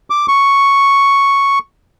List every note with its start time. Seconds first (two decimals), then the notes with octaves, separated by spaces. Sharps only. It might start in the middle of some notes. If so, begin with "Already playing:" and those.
0.10 D6
0.28 C#6